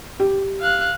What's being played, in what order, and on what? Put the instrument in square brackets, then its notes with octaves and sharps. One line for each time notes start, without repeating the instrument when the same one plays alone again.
[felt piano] G4
[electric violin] F5 F#6